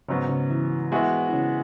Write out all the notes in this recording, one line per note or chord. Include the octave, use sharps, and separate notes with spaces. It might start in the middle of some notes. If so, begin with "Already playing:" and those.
G#2 C#3 F#3 B3 C#4
C#3 C#4
E3 E4
E3 G#3 B3 E4 F#4 E5
E4
C#3 C#4